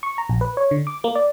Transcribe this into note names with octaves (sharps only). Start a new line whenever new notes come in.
C#6
A#5
A#1
B4
C#5
D3
D6
A#3
D5